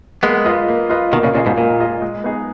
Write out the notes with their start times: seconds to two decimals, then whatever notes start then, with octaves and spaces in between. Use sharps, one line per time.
0.23 G#3 A#3 B3
0.45 F4 B4 D#5
0.68 A#3
0.90 F4 B4 D#5
1.12 B2 D#3 A#3
1.23 A#2 C#3
1.34 A#2 C#3 F4 G#4 D#5
1.46 G#2 B2
1.57 A#2 A#3
1.80 F4 G#4 D#5
2.02 G#3
2.24 B3 D#4 G#4